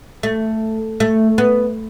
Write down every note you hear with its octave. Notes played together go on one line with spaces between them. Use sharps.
A3
A3
B3